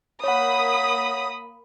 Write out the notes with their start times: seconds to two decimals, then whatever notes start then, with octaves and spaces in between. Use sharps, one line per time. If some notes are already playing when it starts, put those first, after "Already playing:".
0.24 A#3 C#5 F#5 B5 D#6